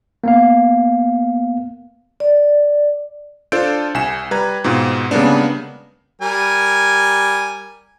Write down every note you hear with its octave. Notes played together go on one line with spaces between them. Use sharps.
A#3 B3 F5
D5
D4 F4 A4 C5 G6 D7
C2 G#5 E7
G3 B4 A#5 G#6
G#2 B2 C4 F4
C#3 G3 G#3 A#3 B3 D4
G3 A#4 G#5